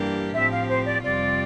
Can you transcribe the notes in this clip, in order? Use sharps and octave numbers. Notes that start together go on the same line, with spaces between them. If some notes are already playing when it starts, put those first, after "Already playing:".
Already playing: G2 E3 A#3 D4 G4
A2 F3 C4 G4 E5
F5
C5
D5
F2 C3 G3 C4 F4 D5